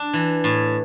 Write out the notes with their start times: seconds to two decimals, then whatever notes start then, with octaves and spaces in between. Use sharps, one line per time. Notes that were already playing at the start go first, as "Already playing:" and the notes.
Already playing: D4
0.13 E3
0.44 A2